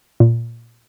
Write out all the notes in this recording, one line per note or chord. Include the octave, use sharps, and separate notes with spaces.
A#2